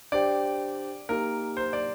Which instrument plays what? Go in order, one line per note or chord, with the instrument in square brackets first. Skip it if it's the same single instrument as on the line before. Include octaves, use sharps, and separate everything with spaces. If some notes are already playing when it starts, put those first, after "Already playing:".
[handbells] D4 G4 C5 G5 [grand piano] D5
[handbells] A#3 D#4 G4 [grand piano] A#4
[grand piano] C5
D5